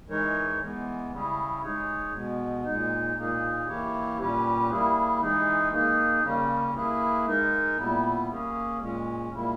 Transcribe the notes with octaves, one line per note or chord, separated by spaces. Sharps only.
E3 G#3 D#4 A#4 C#5
E3 G#3 B3
C#3 G3 C#4 E4 G#4
G#3 D#4 G#4 C#5
B2 G#3 B3
A#2 G#3 D#4
A#2 A#3 D#4 G#4
E3 A#3 E4 G4 C#5
A#2 G3 C#4 G4 B4
G3 A#3 E4 G#4
E3 G#3 D#4 G#4
A#3 D#4 G#4
C#3 G3 A#3 C#4
A#3 E4 G#4 B4
G#3 D#4 A#4
A#2 G3 B3 E4
A#3 C#4 G#4
A#2 G#3 C#4
A#2 G3 A#3 E4